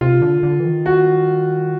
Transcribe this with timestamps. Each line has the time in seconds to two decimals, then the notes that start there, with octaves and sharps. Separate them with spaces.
0.01 C3 F4
0.22 D3
0.43 D3
0.60 E3
0.65 D#3
0.86 F#4